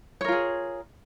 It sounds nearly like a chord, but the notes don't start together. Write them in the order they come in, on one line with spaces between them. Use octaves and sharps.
C#5 A#4 F4 G#4